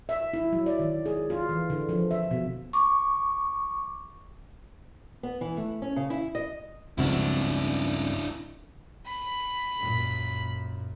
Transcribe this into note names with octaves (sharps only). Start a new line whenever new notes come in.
E5
E4
F#3
D5
D#3
G#4
F4
E3
D3
F3
E5
B2
C#6 D6
B3
E3
A3
C#4
C#3
E4
D#5
C#2 G2 C#3 F3 C4 D4 E4 F#4
B5
F#2 A#2